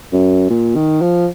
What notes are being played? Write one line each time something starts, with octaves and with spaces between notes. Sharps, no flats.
F#2
A#2
D#3
F3